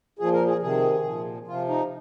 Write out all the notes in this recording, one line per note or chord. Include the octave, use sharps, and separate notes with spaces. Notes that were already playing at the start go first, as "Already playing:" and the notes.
A#2 F3 G#4
A#4
G#4
C3 D#3 G#4
A#2 F3
C3 F3 F4
D#4